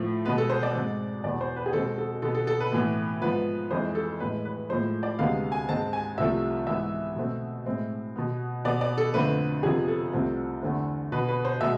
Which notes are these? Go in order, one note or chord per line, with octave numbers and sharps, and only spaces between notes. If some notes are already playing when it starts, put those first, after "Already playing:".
Already playing: A2 F3 A3
B2 G#3 B3 B4
A4
C5
D5
G#2 G#3 C4
E2 B2 B3 D5
C5
B4
G#4
B2 G#3 C4 A4
A4
B2 B3 A4
A4
A4
B4
A2 E3 B3
G#2 F3 B3 B4
F2 E3 G#3 C5
A4
A2 E3 G#3 B4
B4
A2 F3 G#3 C5
D5
D2 C3 G#3 B3 F5
G#5
G#2 G#3 C4 A5
G#5
C2 C3 F3 A3 E5
G#2 E3 B3 E5
B2 A3 C4
A2 G#3 C4
B2 B3
B2 B3 D5
D5
A4
F2 D3 A3 C4 B4
F2 C3 F3 B3 G#4
A4
C2 C3 F3 A3 C4
E2 D3 A3 C4
B2 B3 B4
B4
C5
B2 G#3 B3 E5